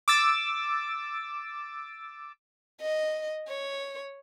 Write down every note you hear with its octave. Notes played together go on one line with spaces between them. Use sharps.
D6 E6 A6
D#5
C#5